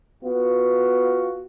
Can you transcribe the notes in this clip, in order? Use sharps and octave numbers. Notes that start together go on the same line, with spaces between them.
B3 F4 F#4